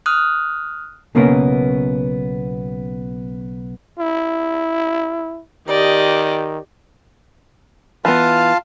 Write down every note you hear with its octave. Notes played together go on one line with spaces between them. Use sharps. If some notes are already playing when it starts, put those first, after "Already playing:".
D#6 F6 F#6
B1 C#3 A#3 B3 C#4 A#4
E4
D#3 G4 D5 D#5
E3 B3 F4 F5 A5